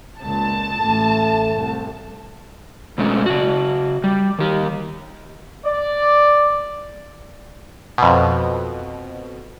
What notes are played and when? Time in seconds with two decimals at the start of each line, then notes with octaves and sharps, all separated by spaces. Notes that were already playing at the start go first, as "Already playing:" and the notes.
0.20 C#2 A#2 A5
0.81 A1 A2 A3
1.54 C2
2.98 B2 G#3 A3 C#4
3.26 C#3 F#4
4.04 G3
4.39 D#3 G4
5.66 D5
7.98 F2 B2